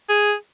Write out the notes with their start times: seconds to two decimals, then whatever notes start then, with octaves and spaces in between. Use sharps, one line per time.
0.09 G#4